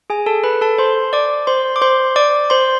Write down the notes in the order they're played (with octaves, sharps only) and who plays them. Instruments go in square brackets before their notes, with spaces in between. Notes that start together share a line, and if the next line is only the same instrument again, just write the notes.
[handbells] G#4 G#5
A4 A5
B4 B5
A4 A5
C5 C6
D5 D6
C5 C6
D6
C5 C6
D5 D6
C5 C6